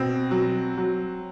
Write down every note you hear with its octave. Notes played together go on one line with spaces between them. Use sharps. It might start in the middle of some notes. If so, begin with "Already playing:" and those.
Already playing: B2 C4
F#3
F#3